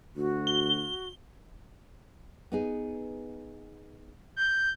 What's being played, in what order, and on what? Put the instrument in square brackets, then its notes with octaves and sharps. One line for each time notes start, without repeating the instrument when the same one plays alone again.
[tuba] D2 [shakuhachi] F#4
[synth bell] G7
[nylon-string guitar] B3 D#4 G#4
[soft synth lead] G6